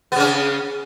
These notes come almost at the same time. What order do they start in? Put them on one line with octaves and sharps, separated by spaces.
B3 C#3 C#4